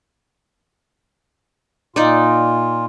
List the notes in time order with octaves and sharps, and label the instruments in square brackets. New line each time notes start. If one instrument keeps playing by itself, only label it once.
[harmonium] A#2 F4 [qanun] D#4 D5